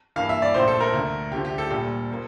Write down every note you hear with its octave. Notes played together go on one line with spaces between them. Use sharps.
G2 E3 A#3 F5
E5
D5
A#1 A2 F3 A3 C5
A4
A#4
D2 D3 A3
D2 D3 F3 A3 G4
G4
A4
A#1 A#2 G3 A4
A#2 F3 A#3